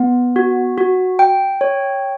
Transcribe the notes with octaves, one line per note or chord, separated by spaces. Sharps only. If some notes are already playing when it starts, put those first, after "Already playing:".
Already playing: B3
F#4
F#4
G5
C#5